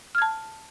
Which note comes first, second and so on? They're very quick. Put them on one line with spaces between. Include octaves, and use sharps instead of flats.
F6 G#6 A5